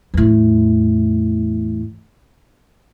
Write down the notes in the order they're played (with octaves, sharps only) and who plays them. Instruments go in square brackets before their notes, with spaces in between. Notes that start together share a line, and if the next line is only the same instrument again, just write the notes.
[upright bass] E2 A2